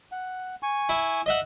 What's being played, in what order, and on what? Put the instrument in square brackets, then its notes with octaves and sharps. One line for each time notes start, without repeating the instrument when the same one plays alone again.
[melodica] F#5
G#5 C#6
[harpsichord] E4
D#5 E5 F#5